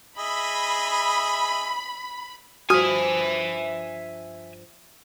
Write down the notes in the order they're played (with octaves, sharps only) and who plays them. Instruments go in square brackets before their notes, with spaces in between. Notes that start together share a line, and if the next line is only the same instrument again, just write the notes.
[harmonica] G#4 D#5 E5 [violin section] B5
[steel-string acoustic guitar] G2 F3 C5 [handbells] F#4 F6 [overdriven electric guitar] E5 G#5 [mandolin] D#6